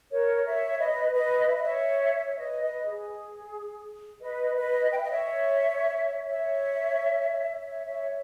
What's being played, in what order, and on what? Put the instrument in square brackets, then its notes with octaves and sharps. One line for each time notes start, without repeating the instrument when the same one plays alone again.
[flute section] A#4 C#5
C#5 E5
B4 D#5
B4 D#5
E5
D#5
C#5 E5
C#5 E5
B4 D#5
B4 D#5
G#4
B4 D#5
B4 D#5
G5
E5
D#5
C#5 E5
C#5 E5
C#5 E5
C#5 E5